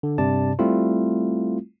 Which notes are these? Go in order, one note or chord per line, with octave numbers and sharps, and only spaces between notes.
D3
G2 C3 D5 A5
G3 A3 C4 E4 F4